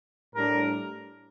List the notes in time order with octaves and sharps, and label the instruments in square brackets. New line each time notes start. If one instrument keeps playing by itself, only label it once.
[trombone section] A2 G3 D4 [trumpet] A#4